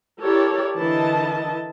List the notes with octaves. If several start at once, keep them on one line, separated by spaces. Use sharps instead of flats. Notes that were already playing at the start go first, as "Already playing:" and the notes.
E4 G4 A4 A#4 C#5 D5
D3 E3 E4 A#4 D#5 A5